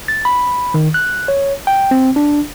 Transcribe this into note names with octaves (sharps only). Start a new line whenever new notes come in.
A6
B5
D#3
F#6
C#5
G5
C4
D4